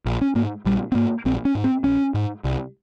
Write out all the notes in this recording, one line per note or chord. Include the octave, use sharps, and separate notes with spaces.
A#1
C#4
G#2 A#3
A#1 G3
C4
G#2 A#3
A#1 C4
C#4
G#2
C4
A#1 C#4
G#2
C2